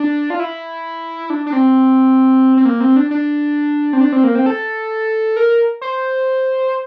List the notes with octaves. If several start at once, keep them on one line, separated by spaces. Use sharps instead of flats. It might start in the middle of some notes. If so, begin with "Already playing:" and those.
Already playing: D4
F4
E4
D4
D4
C4
C4
A#3
C4
D4
D4
C4
D4
C4
A#3
C4
A4
A#4
C5